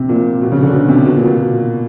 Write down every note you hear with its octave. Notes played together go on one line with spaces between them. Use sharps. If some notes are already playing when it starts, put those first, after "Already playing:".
Already playing: C3
A#2
B2
C#3
D3
B2
C3
B2
A#2
B2